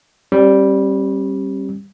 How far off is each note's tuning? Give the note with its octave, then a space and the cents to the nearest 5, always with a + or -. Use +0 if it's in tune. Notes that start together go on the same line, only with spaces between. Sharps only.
G3 +0 C4 +45